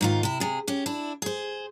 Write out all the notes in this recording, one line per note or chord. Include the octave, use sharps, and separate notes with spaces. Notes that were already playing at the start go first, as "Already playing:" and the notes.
G#2 D#3 F4
C3 E4
C3 G#4
C#4 G4
D4 E4
G#4 C5